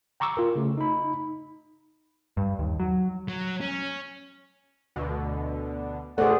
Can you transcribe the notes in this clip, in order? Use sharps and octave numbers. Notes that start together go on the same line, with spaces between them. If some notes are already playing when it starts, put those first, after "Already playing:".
G5 A#5 C#6 D6 E6
F4 A#4
C#3 A3
D#4 B5
G2
D#2
F#3
F#3
C#4
D2 B2 D3
F#2 B2 A3 G#4 C5 D5 F#5